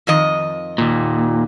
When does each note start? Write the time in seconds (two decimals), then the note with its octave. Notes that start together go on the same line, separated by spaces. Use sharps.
0.07 F2 D#3 D#5
0.78 D#2 A#2